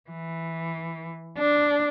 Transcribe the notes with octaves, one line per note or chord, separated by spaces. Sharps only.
E3
D4